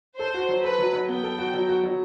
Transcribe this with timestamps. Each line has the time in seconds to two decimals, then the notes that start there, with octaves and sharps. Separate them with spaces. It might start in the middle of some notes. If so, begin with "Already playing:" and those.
0.19 A4 C5
0.34 F#4
0.48 F#3
0.63 A4 B4
0.78 F#3
0.93 F#3
1.09 B3 G5
1.23 A4
1.38 F#4
1.54 F#3
1.69 F#4
1.84 F#3